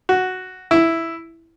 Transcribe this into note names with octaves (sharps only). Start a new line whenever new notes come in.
F#4
E4